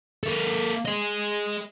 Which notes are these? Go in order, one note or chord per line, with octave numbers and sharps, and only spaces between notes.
A#3 A4
G#4 D#5